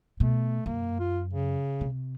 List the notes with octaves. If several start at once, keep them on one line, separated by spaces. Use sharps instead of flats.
B2 A3
F#2 A#3
F4
C#3
C3